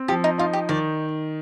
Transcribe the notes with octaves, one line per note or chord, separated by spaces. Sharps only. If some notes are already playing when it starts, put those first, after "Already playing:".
Already playing: C4
F3 G4
D#4
D#4 F4
G4
D#3 D5